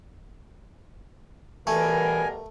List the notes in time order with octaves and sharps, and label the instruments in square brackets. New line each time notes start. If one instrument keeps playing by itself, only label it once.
[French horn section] B2 G3 A#4 [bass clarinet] E3 [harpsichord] A3 [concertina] G#5